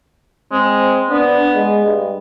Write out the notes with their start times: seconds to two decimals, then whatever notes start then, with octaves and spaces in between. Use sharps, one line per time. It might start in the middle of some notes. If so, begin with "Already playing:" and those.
0.52 G#3 C4
1.10 B3 D4
1.55 G#3
1.86 G2